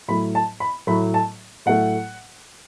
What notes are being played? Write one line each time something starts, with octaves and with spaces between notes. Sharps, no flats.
A2 F#3 A3 B5
A5
B5
A2 F#3 A3 B5
A5
A2 F#3 A3 F#5